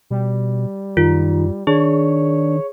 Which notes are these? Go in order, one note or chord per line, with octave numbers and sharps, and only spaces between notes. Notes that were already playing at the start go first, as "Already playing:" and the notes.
B2 G3
F#2 D#3 F4
D#3 D4 G#4 C#5